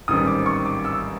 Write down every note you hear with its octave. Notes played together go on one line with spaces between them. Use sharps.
A1 G#2 D#3 G3 C4 D#6
D6
C#6
D6
E6